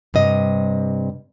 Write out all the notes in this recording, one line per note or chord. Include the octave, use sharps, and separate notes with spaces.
G2 C3 D#5